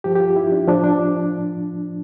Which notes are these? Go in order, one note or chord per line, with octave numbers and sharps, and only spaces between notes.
G2 F3 G4
G4
F4
E4
D4
A2 F3 D4
D4